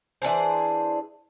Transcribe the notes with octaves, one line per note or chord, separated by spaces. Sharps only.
E3 D4 G#4 C5